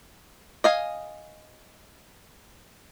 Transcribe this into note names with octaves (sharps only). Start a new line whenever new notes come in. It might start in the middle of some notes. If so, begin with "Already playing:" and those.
D#5 F5 G#5